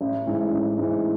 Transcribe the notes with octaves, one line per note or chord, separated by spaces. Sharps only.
A1
G#2 E3
A1
G#2 E3